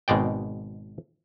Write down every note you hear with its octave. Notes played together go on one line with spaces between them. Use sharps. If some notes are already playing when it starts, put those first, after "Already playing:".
G#1 B2 G#3 D5 G5